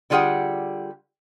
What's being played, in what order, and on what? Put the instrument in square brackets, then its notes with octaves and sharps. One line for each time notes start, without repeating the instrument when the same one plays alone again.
[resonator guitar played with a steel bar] D3 G3 F4 G#4 F#5 G5